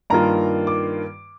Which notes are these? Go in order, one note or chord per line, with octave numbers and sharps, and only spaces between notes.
G2 D#3 A#3 F4 A#5
D6